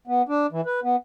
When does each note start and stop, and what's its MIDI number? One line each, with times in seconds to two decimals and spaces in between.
0.07 0.22 59
0.29 0.47 62
0.52 0.61 52
0.66 0.80 71
0.84 0.96 59